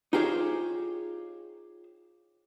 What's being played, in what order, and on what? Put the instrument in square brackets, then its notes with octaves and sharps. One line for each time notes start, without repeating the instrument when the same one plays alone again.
[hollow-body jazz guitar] D#4 F4 G4 G#4 C5 C#5